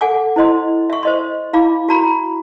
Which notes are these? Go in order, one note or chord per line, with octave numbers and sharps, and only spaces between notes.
A4 F#5 G#5 D6
E4 C5 D#5 C6
E5 C#6
C5 D#5 C6
E4 F5 B5 D6
F#4 A#5 B5